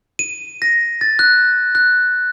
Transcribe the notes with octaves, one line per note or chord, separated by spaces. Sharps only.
D#7
A#6
A6
F#6
F#6